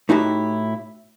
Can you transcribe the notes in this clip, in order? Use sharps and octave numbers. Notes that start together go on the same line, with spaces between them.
A2 D#4 E4 F#4 G4